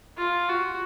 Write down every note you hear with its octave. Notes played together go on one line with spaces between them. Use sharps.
F4
F#4